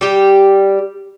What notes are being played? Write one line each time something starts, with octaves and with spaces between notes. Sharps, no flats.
G3 G4